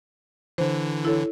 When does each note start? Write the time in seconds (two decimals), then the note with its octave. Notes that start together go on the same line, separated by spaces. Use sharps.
0.58 D3 E3 C5
1.05 E4 A4 C#5